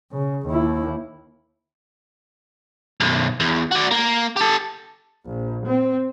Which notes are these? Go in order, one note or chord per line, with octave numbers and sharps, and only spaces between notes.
C#3
D#2 E4
B1 F#2
E2
F#4 D5
A#3
G4 A4
A#1
C4